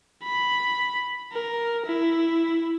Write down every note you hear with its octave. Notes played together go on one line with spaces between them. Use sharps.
B5
A#4
E4